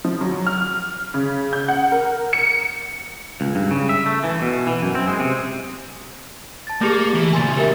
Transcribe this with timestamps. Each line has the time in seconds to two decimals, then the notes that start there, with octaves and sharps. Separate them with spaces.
0.04 F3
0.21 F#3
0.47 F6
1.14 C#3
1.53 G6
1.68 F#5
1.92 A#4
2.33 C#7
3.41 C#2
3.55 G2
3.71 C#3
3.89 E5
4.06 A3
4.24 E3
4.42 B2
4.67 E3
4.82 F#2
4.95 C4
5.08 G#3
5.20 C3
6.67 A5 A6
6.81 A3 A#3 G4 G#4
7.14 E3
7.33 A#2 C#3 G#5 C6 A6
7.57 G4 A#4 E5